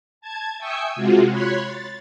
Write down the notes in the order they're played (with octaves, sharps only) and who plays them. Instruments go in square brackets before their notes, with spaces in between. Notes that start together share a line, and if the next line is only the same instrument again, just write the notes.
[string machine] A5 G#6
E5 G5 G#5 C#6 D#6 E6
C3 G#3 F4 F#4
C#5 B5 C6 F#6 G#6
A6